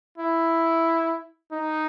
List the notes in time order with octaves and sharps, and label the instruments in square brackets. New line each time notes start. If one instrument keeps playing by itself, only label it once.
[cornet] E4
D#4